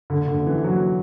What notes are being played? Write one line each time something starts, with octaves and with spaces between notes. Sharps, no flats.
D3
D3
E3
F#3